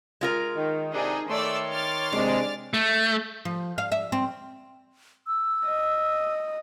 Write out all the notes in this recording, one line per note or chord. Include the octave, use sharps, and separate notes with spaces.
G#3 F4 A#4
D#3
C3 D4 D#4 G#4
D#3 A3 C#5 D5 C6 E6
D6 F6 A6
C3 G#3 D4
A3
F3
F5
E5
C4
E6
D#5